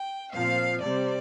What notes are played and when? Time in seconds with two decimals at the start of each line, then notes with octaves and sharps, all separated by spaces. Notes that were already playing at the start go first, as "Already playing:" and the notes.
Already playing: G5
0.33 A#2 F3 C4 F5
0.83 C3 G3 C4 D5